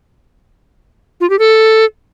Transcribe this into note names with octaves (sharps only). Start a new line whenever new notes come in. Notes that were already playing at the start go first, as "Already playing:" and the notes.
F4
G4
A4